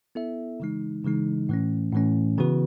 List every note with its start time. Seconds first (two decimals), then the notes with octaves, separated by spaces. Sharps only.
0.15 B3 E4 A4 E5
0.60 C#3 E3 G#3 D#4
1.04 C#3 E3 G#3 D#4
1.49 A2 E3 A3 C#4
1.93 A2 E3 A3 C#4
2.38 C#3 E3 B3 F#4 B4